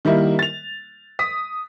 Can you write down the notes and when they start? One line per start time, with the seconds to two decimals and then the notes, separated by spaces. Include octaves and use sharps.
0.05 D#3 G3 A#3 E4
0.39 A6 F7
1.19 D#6 B6